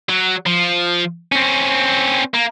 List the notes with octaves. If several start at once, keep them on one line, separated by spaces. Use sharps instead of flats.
F#3
F3
C4 C#4
A#3